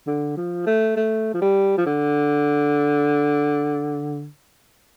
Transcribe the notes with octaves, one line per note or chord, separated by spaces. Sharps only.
D3
F3
A3
A3
F3
G3
F3
D3